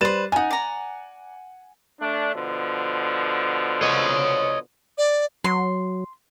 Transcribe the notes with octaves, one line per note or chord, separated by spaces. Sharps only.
G3 B4 C5 A6 E7
D#4 F4 F#5 G#5
D5 A#5
A3 D4
B2 D3 F3
C#5 D#5
D5
F#3 C6